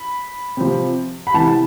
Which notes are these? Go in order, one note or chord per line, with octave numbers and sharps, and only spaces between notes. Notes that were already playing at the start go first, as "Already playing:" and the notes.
Already playing: B5
C3 F3
B5
C3 E3 A5